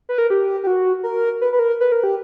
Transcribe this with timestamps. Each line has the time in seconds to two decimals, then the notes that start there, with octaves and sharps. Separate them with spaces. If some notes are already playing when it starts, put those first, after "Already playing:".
0.09 B4
0.18 A#4
0.30 G4
0.63 G4
0.67 F#4
1.03 A#4
1.41 B4
1.53 B4
1.59 A#4
1.81 B4
1.92 A#4
2.04 G4